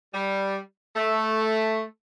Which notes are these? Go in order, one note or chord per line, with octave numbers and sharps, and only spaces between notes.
G3
A3